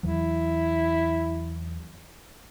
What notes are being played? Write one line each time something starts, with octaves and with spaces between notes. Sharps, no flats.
E2 E3 F#3 E4